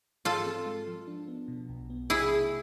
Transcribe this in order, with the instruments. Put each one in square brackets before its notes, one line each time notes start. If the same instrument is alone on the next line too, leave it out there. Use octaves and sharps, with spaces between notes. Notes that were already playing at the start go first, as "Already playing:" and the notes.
[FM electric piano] G#2 [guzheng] F4 A4
[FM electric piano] C4
G#3
F3
D4
B3
B2
B1
B3
[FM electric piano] C3 [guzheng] E4 G#4
[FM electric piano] A3